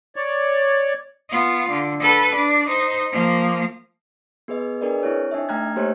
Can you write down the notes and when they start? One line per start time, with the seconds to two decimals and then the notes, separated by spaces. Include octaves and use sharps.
0.16 C#5 D5
1.30 B3 F4
1.70 D3
2.02 A4 B4
2.36 D4
2.67 D#4 C5
3.12 F3 A#3
4.48 B3 G#4 B4 D#5
4.81 D4 G#4 A#4 B4 D5 D#5
5.03 C4 E4 C#5
5.31 D4 D#4 D#5 E5
5.49 A3 G5 A#5 F6 F#6 G#6
5.76 A3 A#3 D#4 G4 C5 C#5